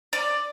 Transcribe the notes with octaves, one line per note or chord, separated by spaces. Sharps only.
D5